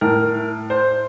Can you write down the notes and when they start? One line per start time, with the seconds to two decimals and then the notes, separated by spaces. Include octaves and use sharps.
0.01 A2 A#4
0.70 C5